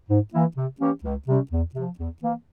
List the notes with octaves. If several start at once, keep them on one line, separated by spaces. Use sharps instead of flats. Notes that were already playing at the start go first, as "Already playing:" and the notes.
G#2
E3 A#3 E4
C3
E3 A#3 C#4 G4
C#2
C3 G3 C#4
E2
C3 F3
E2
E3 A#3